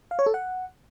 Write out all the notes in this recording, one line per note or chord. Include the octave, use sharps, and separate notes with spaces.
F5
C#5
A4
F#5